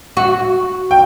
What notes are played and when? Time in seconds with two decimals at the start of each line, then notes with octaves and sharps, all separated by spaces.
0.17 F#4
0.91 G5